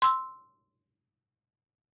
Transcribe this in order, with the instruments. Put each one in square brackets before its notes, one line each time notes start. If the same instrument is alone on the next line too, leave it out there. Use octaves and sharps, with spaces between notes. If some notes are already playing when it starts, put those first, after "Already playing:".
[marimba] C6 E6